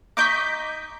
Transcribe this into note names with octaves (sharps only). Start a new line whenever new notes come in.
D#4 D#5 C#6 D6 G6 B6